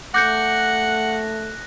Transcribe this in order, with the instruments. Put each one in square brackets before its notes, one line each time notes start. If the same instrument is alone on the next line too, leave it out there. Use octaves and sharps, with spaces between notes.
[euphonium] A3 [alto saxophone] F#5 [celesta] D6 G6 C#7 [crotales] F#6 A#6